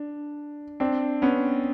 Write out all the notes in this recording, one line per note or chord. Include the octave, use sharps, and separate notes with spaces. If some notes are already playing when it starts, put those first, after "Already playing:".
Already playing: D4
C4 D4
B3 C#4